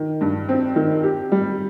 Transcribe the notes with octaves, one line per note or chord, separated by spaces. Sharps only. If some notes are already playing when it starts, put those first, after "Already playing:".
Already playing: D#3
G2
C4
D#3
G4
G3